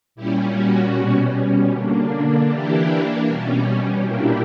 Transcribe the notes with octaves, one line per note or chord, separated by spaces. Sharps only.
A#2 G3 C#4 E4 G4
F#4
B2 G3 C#4
D3 A#3 D4
E3 A#3 D4 E4 G4
B2 G3 C#4
A#2 A#3 D4 E4 G4